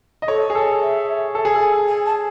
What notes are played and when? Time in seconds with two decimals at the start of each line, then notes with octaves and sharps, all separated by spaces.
0.22 D#5
0.28 A4 C#5
0.50 G#4
0.55 A4
0.81 E5
1.35 A4
1.45 G#4
1.55 A4
1.88 G#5
2.06 A5